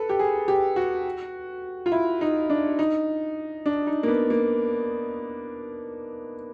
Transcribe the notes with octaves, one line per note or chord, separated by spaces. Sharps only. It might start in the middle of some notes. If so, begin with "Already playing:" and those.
Already playing: A4 B4
G4
G#4
G4
F#4
F4
E4
D#4
D4
D#4
D4
D#4
A#3
B3
A#3